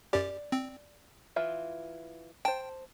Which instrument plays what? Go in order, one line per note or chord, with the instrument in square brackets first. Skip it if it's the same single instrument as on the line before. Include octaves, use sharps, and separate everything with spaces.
[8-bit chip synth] F#2 G4 [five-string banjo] D5
[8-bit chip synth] C4
[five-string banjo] E3 F4 E5
[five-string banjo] C5 A5 [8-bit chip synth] G5